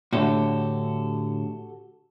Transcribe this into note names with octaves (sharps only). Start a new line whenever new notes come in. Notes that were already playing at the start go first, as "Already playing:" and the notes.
A2 D3 F#4 G4 A4